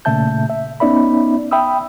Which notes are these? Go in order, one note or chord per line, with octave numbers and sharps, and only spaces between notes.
A#2 C#3 A3 E5 A5 G6
E5
B3 C#4 D#4 D5 E5 B5
E5 G5 B5 D#6 E6